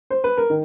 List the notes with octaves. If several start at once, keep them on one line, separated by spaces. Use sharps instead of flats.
C5
B4
A#4
D#3